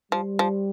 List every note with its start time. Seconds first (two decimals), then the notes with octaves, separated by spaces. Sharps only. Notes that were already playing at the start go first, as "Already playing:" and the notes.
0.12 F3 G3
0.39 F3